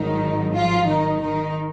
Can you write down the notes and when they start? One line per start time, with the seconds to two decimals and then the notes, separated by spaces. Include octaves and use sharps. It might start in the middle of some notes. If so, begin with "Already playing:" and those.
Already playing: G#1 G#2 D#3 F#3 D#4
0.53 F3 F4
0.87 D#3 D#4
1.22 D#3 D#4